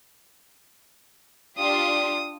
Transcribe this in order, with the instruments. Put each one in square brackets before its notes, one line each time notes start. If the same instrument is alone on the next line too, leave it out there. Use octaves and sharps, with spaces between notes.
[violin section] D4 F4 G4 [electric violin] D#6